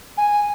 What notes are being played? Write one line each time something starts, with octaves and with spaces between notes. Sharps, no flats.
G#5